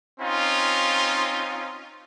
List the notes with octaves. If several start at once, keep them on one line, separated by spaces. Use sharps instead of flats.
C4 C#4 D#4 F4